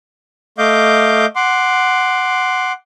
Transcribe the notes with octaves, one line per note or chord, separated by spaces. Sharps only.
A3 D#5 F5 D6 G6
F#5 C6 D6